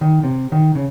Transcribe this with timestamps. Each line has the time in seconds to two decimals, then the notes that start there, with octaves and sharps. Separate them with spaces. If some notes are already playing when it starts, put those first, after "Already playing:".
0.01 D#3
0.23 C3
0.52 D#3
0.75 C#3